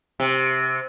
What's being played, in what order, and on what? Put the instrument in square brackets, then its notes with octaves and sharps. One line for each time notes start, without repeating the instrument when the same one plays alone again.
[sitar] C3